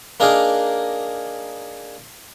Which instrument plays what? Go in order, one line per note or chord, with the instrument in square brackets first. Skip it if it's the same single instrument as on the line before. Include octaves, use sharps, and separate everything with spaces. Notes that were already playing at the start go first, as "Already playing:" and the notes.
[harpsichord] A#3 D4 D#4 G#4 A#4